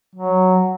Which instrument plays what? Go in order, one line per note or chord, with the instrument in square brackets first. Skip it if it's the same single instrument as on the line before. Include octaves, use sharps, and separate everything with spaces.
[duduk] F#3